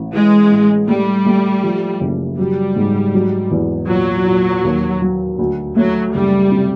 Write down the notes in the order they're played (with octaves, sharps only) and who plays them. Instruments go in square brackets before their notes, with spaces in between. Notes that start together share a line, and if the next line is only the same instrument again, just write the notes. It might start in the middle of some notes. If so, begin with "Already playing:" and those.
Already playing: [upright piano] A1
[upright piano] E3 [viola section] G#3
[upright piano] A2
[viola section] G3 [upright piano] A3
[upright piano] A3
F3
F#1
[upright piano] F#3 [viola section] G3
[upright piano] G#2
F#3
E2
[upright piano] A#2 [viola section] F#3
[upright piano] A#2
D#2
F#3
D2
[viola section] F#3 [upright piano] A3
[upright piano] F#1 [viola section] G3
[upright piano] C3